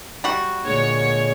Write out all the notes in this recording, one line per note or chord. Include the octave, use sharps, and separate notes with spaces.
G3 F#4
A#2 D3 G#3 C#5